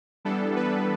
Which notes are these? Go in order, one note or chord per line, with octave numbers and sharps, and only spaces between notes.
E3 G3 B3 D4 A4
B4